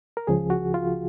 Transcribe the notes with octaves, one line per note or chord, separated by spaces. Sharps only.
A#4
C#2 C#3 F3 G#4
F#4
F4